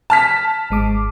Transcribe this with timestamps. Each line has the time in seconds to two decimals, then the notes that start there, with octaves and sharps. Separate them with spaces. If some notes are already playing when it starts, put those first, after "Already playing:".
0.10 A5 F6 B6
0.70 G#1 G#3 D6